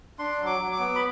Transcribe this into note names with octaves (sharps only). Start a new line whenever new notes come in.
D4 C6
F#3
D6
F#3
D6
B3
B5